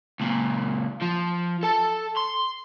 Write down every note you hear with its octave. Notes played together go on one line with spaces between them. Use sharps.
C#2 A#2
F3
A4 A5
C6